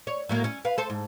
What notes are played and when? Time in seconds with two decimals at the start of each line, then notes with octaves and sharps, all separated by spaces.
0.07 C#5
0.29 A2 F#3 A#3
0.44 C#4
0.65 B4 F5
0.78 A4 C5
0.90 G#2